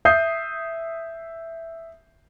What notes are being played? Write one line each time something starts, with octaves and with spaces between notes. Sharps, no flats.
E5 D#6 G6 C7